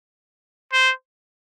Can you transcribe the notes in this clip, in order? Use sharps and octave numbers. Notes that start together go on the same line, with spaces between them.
C5